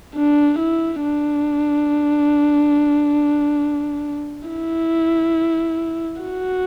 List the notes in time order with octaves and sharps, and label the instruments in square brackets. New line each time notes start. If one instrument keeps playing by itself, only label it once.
[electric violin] D4
E4
D4
E4
F#4